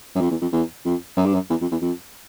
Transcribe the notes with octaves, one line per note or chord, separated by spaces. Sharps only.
F#2
F2
E2
F2
E2
F2
F#2
G2
F#2
E2
F2
E2
F2